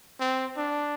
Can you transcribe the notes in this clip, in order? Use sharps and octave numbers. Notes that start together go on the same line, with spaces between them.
C4
D4